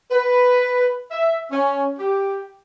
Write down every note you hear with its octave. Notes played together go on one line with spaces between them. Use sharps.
B4
E5
C#4
G4